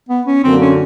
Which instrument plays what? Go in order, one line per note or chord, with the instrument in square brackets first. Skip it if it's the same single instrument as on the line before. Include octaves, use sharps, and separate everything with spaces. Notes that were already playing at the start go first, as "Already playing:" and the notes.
[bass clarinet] B3
C#4
[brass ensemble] F#2 D3 F#3 A#3 [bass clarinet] C4
[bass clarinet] C#4